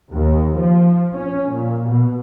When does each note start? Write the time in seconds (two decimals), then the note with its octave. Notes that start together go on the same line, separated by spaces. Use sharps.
0.12 D#2
0.58 F3
1.13 C#4
1.50 A#2
1.90 B2